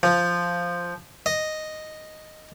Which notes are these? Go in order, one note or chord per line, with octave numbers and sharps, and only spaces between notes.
F3
D#5